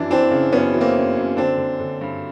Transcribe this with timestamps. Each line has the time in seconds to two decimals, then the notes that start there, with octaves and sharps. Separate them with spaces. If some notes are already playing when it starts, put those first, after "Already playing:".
Already playing: F#2 E3 D4 E4
0.11 E3 C4 D4
0.31 C#3
0.52 F#2 B3 C#4
0.74 E3
0.81 A#3 C4
0.96 F#2
1.16 F#2
1.37 D3 C4 D4
1.58 D3
1.80 D3
2.01 G2